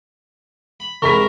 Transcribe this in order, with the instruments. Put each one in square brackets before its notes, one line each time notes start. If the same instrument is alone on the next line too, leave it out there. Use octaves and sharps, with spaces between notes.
[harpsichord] B5
[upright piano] F1 B5 B6 [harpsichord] A#1 G#2 C3 [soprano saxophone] A#4 [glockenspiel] C#6